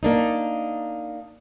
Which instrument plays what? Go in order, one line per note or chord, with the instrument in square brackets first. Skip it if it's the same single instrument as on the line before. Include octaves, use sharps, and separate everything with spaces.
[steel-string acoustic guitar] A#3 D4 D#4